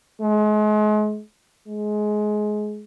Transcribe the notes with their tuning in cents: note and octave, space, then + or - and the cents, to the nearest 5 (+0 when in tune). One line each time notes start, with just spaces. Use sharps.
G#3 +35
G#3 +20